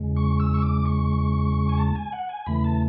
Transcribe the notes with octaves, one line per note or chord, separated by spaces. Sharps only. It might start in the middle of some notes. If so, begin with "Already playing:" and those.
Already playing: E2 C#3 G#3
C#6
E6
C#6
D6
C#6
G#5
A5
G#5
F#5
G#5
E2 C#3 E3 A3 B5
A5